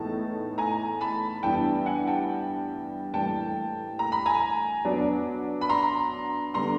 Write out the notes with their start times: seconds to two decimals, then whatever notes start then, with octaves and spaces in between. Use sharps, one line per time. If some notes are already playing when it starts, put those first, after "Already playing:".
Already playing: A2 E3 G#3 B3 D#4 A5
0.58 G#5 A#5
1.01 A5 B5
1.43 G2 E3 G3 B3 E4 G5 A5
1.86 F#5 G#5
2.07 G5 A5
3.13 A2 E3 G3 A#3 G5 A5
3.99 A#5
4.12 B5
4.26 G#5 A#5
4.85 F#3 B3 D4
5.61 B5
5.69 A#5 C6
6.54 D3 G3 B3 D4 A#5 C6